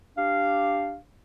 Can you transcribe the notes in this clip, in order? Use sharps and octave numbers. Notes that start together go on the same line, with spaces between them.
D4 G4 F5